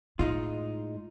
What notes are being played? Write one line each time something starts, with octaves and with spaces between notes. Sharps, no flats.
A2 G#3 D#4 F4